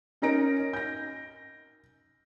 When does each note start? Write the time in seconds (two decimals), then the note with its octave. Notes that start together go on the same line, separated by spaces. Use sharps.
0.22 C#4 D#4 A#4 A#6 D7
0.73 G6 A#6